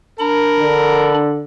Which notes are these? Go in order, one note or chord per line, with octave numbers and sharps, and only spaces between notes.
D4 A#4 B5
D3